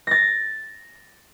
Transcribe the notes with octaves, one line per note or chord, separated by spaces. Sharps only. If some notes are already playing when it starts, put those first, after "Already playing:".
A6 A#6